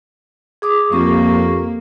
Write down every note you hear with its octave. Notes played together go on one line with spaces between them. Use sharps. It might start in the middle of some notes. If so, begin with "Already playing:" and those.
G#4 D6 D#6
F2 A#3 G4 C#6